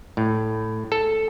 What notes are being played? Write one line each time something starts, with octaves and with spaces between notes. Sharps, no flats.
A2
A4